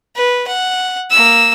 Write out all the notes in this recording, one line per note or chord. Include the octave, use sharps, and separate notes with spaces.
B4
F#5
A#3 E6